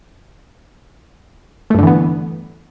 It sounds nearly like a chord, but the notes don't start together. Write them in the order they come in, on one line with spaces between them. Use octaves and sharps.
A3 G2 D3 E3 B3